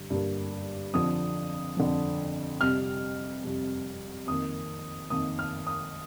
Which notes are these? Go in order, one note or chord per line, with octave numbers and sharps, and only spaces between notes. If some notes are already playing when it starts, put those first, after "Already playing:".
Already playing: G2 D3 G3
G2 D3 G3 A#3
F2 D3 F3 D#6
F2 D3 F3
F2 C3 G3 F6
F2 C3 G3
F2 D#3 A#3 D#6
F2 D#3 A#3 D#6
F6
D#6